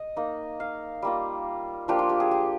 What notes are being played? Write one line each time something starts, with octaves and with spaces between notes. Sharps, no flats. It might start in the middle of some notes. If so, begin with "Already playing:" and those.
Already playing: D#5
A#3 D#4
F5
G3 A#3 F4
F3 A#3 D4 F4 G4
F4
G4
G#4
G4